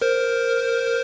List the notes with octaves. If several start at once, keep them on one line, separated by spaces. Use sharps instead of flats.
A#4 C5